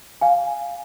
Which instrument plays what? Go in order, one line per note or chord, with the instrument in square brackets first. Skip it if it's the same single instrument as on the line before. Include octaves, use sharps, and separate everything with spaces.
[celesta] F5 G#5